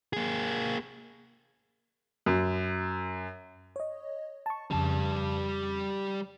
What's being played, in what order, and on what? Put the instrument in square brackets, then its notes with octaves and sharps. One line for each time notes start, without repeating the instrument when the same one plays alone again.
[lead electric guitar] A#3 G#4
[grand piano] F#2
[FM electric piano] C#5 D#5
A5 C#6
[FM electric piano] F2 C#3 [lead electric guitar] G3 A5